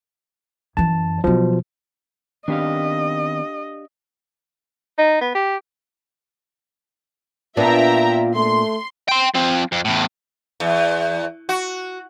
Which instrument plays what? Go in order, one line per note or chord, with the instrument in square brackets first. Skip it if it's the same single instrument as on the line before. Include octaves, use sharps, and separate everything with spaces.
[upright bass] F#2 E3 [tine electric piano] A5
[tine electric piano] B2 F3 [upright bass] F#3 F4
[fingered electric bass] D#3 B3 C4 [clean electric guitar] D4 G4 F5 [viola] D#5
[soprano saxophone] D#4
B3
G4
[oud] A#2 B3 D4 [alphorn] F4 [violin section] E5 G5 A#5
[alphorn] A3 [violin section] C6
[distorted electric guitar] G5 C6
F3 C4
F2
E2 A2
[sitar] E2
F#4